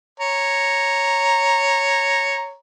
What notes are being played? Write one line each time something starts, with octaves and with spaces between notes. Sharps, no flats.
C#5 A#5